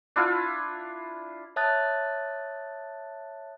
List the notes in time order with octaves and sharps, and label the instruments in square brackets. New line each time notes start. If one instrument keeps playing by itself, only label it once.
[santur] D4 E4 F4
[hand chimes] C#5 E5 A5 D#6 F#6 A6